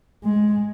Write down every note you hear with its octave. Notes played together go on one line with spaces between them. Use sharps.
G#3